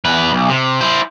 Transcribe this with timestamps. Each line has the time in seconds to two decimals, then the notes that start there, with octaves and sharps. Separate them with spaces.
0.05 E2 B4
0.33 B1
0.49 C3
0.81 E4 C5